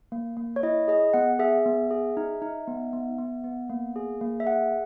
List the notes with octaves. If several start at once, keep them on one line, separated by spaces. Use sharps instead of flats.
A#3
A#3
C#5
E4 D#5
G#4 D#5
B3 F#5
G#4 E5
B3
G#4
D#4
D#4
B3
B3
B3
B3
A#3
G#4
A#3
E5
G#4 F#5